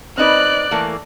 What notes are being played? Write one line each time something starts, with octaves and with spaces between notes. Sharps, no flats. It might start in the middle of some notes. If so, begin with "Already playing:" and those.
C4 D#4 B4 D5 F#6
E3 A3 A#3